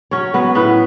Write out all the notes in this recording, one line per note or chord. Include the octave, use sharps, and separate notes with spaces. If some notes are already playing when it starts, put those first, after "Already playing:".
F#3 C#4 C#5
F#3 B3 B4
A2 B3 B4